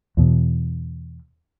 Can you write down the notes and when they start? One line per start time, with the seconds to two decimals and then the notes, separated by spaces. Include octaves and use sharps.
0.17 E2 B2